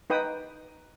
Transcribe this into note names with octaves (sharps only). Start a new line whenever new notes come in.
D#4 B4 G5 D#6